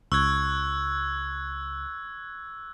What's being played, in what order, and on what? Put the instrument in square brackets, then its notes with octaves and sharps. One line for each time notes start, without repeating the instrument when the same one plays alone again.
[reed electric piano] C#2 [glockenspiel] C#6 [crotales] E6 F#6 G#6